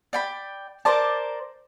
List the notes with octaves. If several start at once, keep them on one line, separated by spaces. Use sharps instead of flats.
D5 G5 B5
A#4 C5 D5 A5